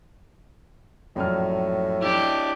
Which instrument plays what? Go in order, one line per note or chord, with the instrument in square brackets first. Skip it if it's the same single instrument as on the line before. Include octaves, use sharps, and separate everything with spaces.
[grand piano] A#1 F#2 F6 [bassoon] A2
[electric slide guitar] D4 E4 [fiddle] G4